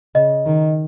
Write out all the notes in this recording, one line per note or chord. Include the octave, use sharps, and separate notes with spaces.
C#3 D#5
D#3